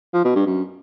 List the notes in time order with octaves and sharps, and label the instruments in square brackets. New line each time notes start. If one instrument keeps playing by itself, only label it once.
[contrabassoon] F3
B2
G2
F#2